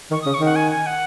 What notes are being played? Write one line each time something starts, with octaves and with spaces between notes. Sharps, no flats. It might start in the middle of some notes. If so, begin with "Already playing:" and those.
D#3 C#6
C#3 D#6
C#6
D#3 F#5
G#5
G#5
F#5